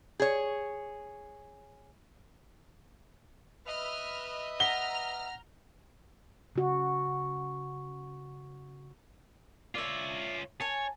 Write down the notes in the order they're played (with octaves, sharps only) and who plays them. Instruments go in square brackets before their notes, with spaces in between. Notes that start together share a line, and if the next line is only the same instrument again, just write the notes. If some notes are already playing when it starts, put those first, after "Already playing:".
[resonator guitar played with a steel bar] G#4 C#5
[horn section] B4 D#5 E5 [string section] F6
[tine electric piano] F#5 A#6 B6 [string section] A#5 F6 [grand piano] G7
[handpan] C#3 F#4
[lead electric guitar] F4 C#5 [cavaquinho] D5 E5
[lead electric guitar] C#5 [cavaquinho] G#5 A5